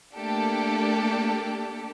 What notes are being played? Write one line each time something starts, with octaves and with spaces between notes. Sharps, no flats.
A3 A#3 D4 G4 A4